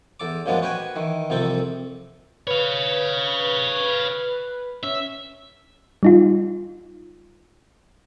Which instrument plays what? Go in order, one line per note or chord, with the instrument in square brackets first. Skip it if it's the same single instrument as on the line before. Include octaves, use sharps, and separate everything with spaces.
[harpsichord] E2 A4 D6
F#2 A#2 F3 G#3 B3 D4
F#4 B4 G5 G#5
D#3 E3
C2 F2 C3 C4 A4
[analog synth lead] B4 [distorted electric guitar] C#5 F5
[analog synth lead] C#4 [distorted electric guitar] E5
[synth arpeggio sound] G3 D#4 F4